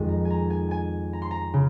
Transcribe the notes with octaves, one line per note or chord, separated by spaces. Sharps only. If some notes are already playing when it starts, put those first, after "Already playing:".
Already playing: F2 D#3 G#3
A#5
G#5
A#5
G#5
G#5
A#5
C6
A#5
C#3